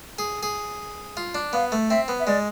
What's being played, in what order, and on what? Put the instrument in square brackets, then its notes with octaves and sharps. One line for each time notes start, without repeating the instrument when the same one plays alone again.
[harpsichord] G#4
G#4
F4
D4
[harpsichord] B3 [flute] F5
[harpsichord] A3
[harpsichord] C4 [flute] E5
[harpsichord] B3
[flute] E5
[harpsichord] G#3 [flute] D5